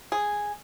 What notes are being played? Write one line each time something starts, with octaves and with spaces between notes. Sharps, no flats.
G#4